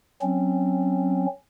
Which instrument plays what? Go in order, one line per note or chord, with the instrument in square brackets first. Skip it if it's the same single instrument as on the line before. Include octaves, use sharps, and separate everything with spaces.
[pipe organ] F#3 C4 C#4